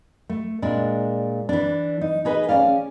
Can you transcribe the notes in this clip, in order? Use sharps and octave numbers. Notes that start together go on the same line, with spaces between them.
A3
A#2 G#3 D4
E3 D4
D#4
D#4 G#4 B4 D#5
C#4 G#4 D5 F5